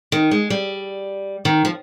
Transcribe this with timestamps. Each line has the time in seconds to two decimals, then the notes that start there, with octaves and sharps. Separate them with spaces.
0.12 D#3
0.31 G#3
0.50 G3
1.45 D#3
1.65 F3